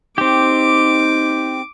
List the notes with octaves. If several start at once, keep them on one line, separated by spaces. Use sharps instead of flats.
C4 D#4 G4 D6